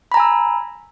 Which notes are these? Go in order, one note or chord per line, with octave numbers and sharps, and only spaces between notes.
G#5 A#5 B5 E6